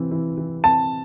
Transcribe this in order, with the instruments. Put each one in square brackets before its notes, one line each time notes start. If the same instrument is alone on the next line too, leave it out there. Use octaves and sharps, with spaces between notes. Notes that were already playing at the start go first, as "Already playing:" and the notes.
Already playing: [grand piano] C3 E3 C4
E3
E3
[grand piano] C4 [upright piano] A5